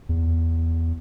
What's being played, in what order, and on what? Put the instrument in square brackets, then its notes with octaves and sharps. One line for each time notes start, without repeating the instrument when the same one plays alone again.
[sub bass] E2